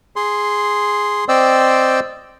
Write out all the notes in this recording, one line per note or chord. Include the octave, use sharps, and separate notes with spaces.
G#4 C6
C4 C5 D5 D#5 G5 E6